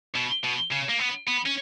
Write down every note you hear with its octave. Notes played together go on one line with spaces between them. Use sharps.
B2
B2
C#3
A#3
B3
B3
C#4